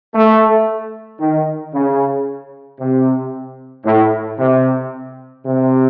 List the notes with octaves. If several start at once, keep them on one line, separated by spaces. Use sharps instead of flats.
A3
D#3
C#3
C3
A2
C3
C3